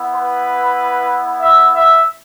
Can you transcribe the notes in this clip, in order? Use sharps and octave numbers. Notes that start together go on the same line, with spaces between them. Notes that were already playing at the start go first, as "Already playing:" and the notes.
Already playing: B3 E4
B4
E5
E5